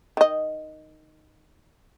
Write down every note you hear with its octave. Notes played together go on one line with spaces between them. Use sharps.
D#3 D#5